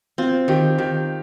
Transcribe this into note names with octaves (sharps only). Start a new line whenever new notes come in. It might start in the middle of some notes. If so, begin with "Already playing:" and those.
C4 F4
D#3 G4
D#3 G4